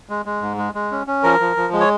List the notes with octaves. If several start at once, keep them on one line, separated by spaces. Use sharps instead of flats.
G#3
G#3
G#2
G#3
G#3
C#4
C#4
F3 A#4
F3
F3
G#3
C#5